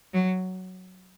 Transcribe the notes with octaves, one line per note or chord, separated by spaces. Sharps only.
F#3